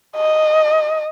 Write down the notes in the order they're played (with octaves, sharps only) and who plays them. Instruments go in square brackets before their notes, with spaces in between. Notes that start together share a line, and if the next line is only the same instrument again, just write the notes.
[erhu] D#5